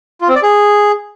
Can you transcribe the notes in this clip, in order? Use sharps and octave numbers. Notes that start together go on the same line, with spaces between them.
F4
C4
D5
G#4